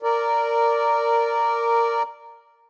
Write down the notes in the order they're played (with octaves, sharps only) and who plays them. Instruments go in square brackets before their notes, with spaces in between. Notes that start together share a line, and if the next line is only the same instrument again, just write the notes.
[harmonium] A#4 D5